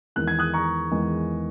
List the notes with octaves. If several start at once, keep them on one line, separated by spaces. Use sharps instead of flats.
E2 D#3 G#3 F#6
G#6
D#6 F#6
A#5 C#6
E2 D#3 G#3